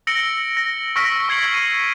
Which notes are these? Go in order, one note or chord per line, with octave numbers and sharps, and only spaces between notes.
E6 A#6 C#7 D7 F#7 G7
A#6
C#6 E6 F6 A#6 B6 D7
C#6 G#6 C7 C#7 F#7
C7 D#7